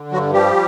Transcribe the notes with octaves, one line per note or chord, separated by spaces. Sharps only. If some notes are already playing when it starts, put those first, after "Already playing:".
Already playing: D3
G2 F#3 F#4
F3 G3 G4